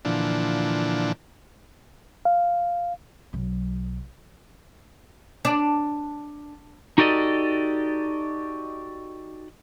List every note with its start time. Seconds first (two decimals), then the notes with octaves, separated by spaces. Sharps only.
0.05 A#2 D3 E3 F3 D4
2.25 F5
3.33 B1 F#3
5.45 D4
6.98 D#4 F#4 G4 A4 D5 D#5